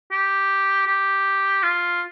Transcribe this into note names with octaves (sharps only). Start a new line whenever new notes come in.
G4
G4
F4